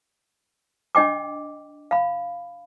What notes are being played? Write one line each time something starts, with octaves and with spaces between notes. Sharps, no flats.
D4 D#5 G5 D6
F5 B5